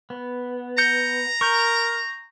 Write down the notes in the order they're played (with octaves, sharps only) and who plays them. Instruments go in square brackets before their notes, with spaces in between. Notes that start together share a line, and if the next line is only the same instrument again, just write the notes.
[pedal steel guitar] B3
[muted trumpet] A#5 [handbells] G6 C#7
[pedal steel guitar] A#4 [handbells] C#6 G6